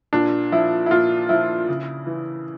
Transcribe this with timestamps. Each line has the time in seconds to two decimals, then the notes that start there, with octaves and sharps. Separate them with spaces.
0.13 A#2 D4
0.52 F3 E4
0.86 E4
0.91 A#2 F4
1.29 F3 E4
1.68 C#3
2.07 E3